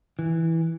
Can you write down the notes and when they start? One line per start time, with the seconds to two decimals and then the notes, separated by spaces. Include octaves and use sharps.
0.19 E3